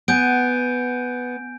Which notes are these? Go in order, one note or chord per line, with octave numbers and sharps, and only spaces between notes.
B3 G#5 G6 D7